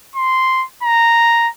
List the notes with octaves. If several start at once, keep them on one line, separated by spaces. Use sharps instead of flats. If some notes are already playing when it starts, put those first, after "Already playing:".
C6
A#5